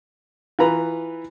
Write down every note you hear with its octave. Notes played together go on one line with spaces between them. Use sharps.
E3 F4 B4 A#5 B5